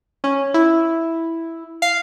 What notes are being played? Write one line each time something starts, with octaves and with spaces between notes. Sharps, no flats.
C#4
E4
F5